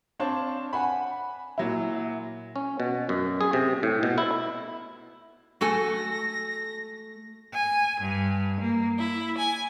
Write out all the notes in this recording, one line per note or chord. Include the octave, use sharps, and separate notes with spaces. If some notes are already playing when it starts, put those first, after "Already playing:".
C4 D4 C5 C#5 F5 A5
F#5 G#5 B5
A#2 F#3 E4
C#4
B2
F#2
G#4
C3
A2
B2
E4
A3 F#4 A4 G#5 A#6
G#5
G2
A#3
E4
G#5